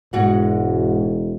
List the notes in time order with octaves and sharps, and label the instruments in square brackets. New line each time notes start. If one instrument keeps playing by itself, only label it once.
[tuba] E1 [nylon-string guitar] G#2 F#4 F#5